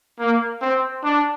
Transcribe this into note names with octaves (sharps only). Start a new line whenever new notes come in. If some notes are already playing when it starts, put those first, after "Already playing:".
A#3
C4
D4